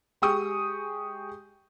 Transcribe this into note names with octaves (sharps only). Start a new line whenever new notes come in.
G#3 G4 G5 C#6 D#6 D#7